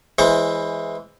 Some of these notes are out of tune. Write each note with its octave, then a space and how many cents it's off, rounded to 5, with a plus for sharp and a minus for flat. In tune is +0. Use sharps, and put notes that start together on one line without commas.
E3 +0 G#3 +0 C5 +20